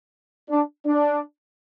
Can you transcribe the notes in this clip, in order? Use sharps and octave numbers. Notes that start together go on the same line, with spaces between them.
D4
D4